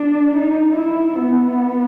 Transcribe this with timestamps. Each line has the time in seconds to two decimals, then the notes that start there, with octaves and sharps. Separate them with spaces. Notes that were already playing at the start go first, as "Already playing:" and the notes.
Already playing: D4
0.37 D#4
0.76 E4
1.16 B3